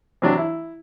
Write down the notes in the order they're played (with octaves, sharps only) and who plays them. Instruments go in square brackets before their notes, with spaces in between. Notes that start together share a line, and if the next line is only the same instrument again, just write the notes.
[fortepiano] C3 F#3 D4
E4